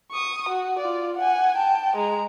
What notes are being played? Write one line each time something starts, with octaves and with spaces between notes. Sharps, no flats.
C#6 D#6
F#4
F4 D5
F#5 G#5
G5 A5
G#3 A#5